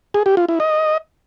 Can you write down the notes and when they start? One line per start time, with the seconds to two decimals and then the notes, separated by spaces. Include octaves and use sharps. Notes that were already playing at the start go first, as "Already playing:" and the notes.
0.14 G#4
0.26 G4
0.37 F4
0.49 E4
0.60 D#5